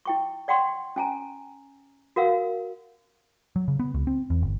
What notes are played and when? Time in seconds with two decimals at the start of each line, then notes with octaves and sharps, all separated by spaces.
0.05 E4 G5 C#6
0.48 D5 F#5 G5 C6 C#6
0.96 C#4 G#5 A#5
2.16 F#4 A#4 F5 F#5 E6
3.56 F#3
3.68 C#3
3.79 B3
3.94 C#2
4.07 C4
4.30 E2
4.42 G1